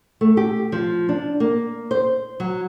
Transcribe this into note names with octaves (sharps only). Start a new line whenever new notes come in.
A3
G4
F3
D4
A#3
C5
F#3